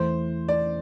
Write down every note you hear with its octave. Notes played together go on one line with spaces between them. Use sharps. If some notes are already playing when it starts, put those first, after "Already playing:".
Already playing: E2 E3 A3 E4 C5
D5